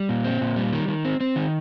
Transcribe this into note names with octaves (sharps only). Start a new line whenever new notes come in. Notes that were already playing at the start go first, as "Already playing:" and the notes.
Already playing: G3
A#2
C4
A#2
G3
D#3
D#3
C4
C4
D#3